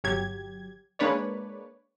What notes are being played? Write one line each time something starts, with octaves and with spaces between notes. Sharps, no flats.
G1 F#3 G4 G#6
G#3 A#3 D4 B4 C#5 D5